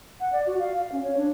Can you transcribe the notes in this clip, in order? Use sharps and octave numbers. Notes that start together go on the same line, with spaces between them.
F#5
D5
F#4
F5
F5
C#4
C#5
D4